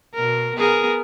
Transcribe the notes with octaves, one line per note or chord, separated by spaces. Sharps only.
B2 A#4
B3 G#4 A#4